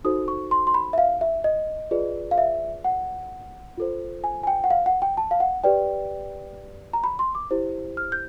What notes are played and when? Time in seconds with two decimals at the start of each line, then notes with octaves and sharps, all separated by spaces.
0.04 D#4 F#4 A4 C5 D#6
0.28 C#6
0.51 C6
0.67 C6
0.74 B5
0.93 E5
0.98 F5
1.21 E5
1.44 D#5
1.91 F4 G#4 B4 D5
2.31 F5
2.38 E5
2.85 F#5
3.78 F4 A4 C5
4.24 G#5
4.43 G#5
4.47 G5
4.64 F#5
4.70 F5
4.86 F#5
5.02 G5
5.17 A5
5.31 F5
5.40 F#5
5.64 G4 B4 D5 G5
6.93 A#5
7.04 B5
7.19 C6
7.35 D6
7.51 E4 G4 C5
7.97 F6
8.12 G6